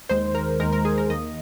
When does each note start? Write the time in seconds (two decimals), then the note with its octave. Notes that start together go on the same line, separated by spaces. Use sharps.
0.09 D#2 D#3 G#3 C5
0.35 A#4
0.60 D#2 D#3 G#3 A#4
0.73 A#4
0.85 G#4
0.98 A#4
1.10 D#2 D#3 A#3 D#5